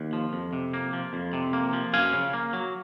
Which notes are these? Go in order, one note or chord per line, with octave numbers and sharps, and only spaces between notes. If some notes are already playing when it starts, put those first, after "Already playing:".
Already playing: D#2
F3
F2
C3
A#3
F3
F2
C3
A#3
F3
F#2 F5 G#5
C#3
A#3
F#3